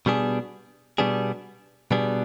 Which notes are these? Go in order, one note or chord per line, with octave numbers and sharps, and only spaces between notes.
B2 G3 B3 D4 G#4
B2 G3 B3 D4 G#4
B2 G3 B3 D4 G#4